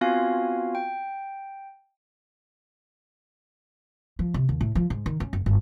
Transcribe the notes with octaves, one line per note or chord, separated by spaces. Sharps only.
B3 C4 F4 F#4 F5 G#5
G5
F3
C3
D#2
A2
F3
G#2
D#3
C#4
F#1
G1